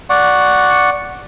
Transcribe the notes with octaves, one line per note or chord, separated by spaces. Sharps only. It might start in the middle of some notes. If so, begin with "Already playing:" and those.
D5 F#5 C#6